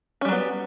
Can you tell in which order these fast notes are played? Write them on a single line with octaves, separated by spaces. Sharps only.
C#4 G3 F#3 B3